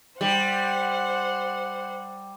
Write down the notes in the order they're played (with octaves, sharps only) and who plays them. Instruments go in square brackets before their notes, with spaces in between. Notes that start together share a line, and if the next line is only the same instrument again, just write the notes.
[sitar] G3 [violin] C5 F#5